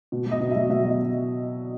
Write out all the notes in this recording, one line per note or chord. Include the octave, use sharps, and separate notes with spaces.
B2
F#3
D#5
B2
F#3 E5
B2 E5
F#3
D#5